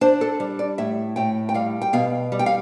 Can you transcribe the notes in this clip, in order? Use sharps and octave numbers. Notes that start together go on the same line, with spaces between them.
D4 C5
A4
G3
D5
A2 E5
A2 G5
G5
G3 F5
G5
B2 F5
G3
G5
F5